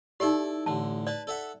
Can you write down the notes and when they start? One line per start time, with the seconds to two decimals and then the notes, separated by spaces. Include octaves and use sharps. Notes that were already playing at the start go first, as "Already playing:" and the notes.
0.20 D#4 E4 G4 A4 D5
0.66 A1 D3 A5
1.07 B4 D5 A5
1.27 A4 E5 F#5